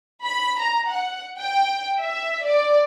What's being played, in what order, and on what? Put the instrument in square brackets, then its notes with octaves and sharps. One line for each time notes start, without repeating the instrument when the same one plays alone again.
[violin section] B5
A#5
F#5
G5
E5
D5